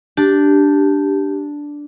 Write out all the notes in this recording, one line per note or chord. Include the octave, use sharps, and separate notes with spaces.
D4 G4